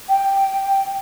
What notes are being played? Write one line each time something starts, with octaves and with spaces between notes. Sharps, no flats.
G5